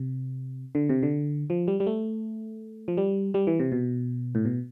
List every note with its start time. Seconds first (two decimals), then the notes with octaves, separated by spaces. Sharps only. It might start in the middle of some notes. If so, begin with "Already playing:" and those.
Already playing: C3
0.75 D3
0.89 C3
1.03 D3
1.50 F3
1.68 G3
1.80 G3
1.87 A3
2.88 F3
2.97 G3
3.34 G3
3.47 E3
3.60 C3
3.72 B2
4.35 A2
4.45 B2